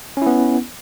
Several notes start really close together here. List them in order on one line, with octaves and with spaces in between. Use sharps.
C#4 E4 B3